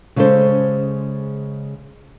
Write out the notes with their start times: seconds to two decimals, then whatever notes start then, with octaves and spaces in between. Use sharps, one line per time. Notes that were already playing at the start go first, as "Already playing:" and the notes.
0.16 C#3 G#3 C#4 A4 C5